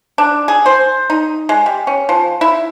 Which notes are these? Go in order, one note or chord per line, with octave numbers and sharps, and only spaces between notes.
D4
G#4
C5
D#4
G#3
G3
C#4
F3
E4